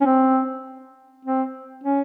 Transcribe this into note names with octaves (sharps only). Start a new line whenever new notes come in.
C#4
C4
C4
C#4